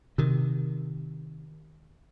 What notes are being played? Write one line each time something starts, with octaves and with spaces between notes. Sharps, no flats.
C3 D#3